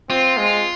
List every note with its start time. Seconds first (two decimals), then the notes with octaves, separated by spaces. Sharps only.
0.09 C4 F4
0.37 G#3